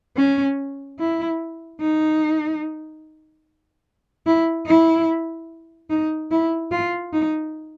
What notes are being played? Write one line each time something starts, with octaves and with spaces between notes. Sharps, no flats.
C#4
E4
D#4
E4
E4
D#4
E4
F4
D#4